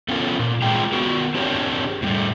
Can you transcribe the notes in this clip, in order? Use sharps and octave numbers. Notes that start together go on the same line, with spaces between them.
A3 B3 C#4 F4 A4 A#4
A#2
G#3 C4 F4 G#4 G5 A#5
B3 F#4 A#4
C4 D4 G4 G#4 A#4 C#5
A2 G3 A3